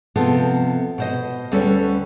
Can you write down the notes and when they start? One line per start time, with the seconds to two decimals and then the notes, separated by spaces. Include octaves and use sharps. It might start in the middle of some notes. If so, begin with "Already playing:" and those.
0.16 C3 F3 B3 A4
0.98 B2 C5 D#5
1.52 D2 G3 C#4 A4 B4 C#5